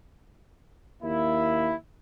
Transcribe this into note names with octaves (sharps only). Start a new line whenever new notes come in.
D#2 A#3 E4